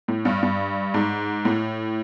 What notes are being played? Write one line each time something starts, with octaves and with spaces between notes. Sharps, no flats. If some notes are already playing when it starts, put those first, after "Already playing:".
A2
G2
G2
G#2
A2